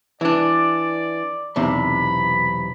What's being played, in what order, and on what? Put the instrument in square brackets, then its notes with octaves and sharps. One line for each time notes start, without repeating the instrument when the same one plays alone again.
[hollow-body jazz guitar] E3 D4 [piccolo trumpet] D5
[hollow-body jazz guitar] B1 E2 C3 [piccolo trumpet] B5